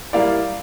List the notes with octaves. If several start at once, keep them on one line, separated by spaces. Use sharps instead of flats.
G3 A#3 E4 D5 F5